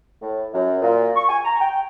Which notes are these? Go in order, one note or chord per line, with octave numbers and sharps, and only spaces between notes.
A2
F#2
A#2
C#6
G#5
A#5
G5